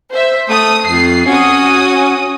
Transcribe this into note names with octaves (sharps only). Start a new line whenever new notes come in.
C5 E5
A3 D#6
F2 C7
C#4 F#4 D#6